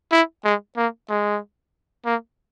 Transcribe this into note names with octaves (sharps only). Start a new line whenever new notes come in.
E4
G#3
A#3
G#3
A#3